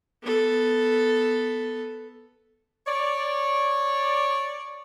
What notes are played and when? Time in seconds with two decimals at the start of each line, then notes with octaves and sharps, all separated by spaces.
0.23 B3 A4
2.86 C#5 D5